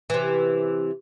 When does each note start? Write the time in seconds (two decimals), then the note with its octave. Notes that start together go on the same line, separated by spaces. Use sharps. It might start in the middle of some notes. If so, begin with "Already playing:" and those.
0.10 C3 E3